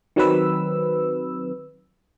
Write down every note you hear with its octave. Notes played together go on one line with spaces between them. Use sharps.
D#3 F#3 C4 B4 E6